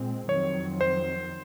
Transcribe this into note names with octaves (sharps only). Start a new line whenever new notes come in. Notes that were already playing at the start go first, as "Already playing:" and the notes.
Already playing: A#2 G#3 C4
F2 D#3 F#3 C4 C#5
C5